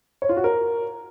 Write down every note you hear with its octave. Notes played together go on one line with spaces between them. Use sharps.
C#5
F4
F#4
A#4